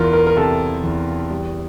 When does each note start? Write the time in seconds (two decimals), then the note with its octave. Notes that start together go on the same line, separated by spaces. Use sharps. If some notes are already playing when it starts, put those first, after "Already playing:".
Already playing: E2 E3 F4 A#4
0.13 A#4
0.27 A#4
0.37 C3 A4
0.83 E2
1.31 G3